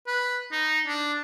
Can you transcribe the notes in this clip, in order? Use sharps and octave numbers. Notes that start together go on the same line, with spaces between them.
B4
D#4
D4